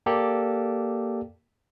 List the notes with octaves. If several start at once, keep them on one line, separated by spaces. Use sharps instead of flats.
A#3 G4 A4 D5